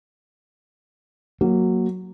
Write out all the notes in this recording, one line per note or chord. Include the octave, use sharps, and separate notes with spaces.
F#3 A#3